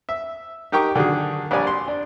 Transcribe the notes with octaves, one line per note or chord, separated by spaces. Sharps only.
E5
D#4 G4 A#4 G5 C#6
D3 D#3 F#3 G#4
A#1 G3 C#5 D5 G#5
C6
D4